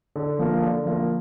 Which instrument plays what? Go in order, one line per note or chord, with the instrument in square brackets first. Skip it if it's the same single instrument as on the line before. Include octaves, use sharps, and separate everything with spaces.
[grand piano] D3
F3 A#3 F4 A#4
D3
F3 A#3 F4 A#4